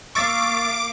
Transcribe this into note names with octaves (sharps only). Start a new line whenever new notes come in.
A#3 F5 C#6 D6 E6 A6